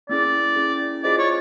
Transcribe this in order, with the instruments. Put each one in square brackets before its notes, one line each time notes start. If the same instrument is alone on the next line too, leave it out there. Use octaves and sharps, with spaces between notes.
[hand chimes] A#3 C#4 E4 G#4 [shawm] D5
[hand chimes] A#3 C#4 E4 G#4
[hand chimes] F4 G#4 C5 D#5 [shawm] D5
[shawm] C#5